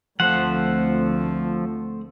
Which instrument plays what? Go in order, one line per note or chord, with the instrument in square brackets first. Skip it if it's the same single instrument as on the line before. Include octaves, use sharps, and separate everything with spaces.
[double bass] D2 C4 [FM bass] F3 [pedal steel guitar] A3 C5 F#5